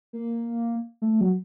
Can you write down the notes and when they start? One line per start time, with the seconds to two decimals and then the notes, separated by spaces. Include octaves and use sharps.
0.13 A#3
1.02 A3
1.21 F#3